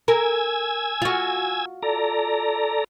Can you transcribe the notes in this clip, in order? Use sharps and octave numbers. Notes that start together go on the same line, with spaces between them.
A#4 G#5 E6 G#6
F4 F#4
A4 D5 A#5